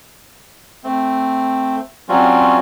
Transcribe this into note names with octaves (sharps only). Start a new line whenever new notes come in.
A3 C4
F#3 G3 C4 C#4 F4 F#4